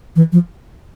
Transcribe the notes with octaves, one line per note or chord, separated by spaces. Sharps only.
E3
F3